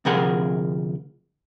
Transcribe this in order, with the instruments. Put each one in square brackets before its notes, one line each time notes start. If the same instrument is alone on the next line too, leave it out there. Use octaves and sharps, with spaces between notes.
[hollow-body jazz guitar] D2 C3 F3 G#4 A#4 F#5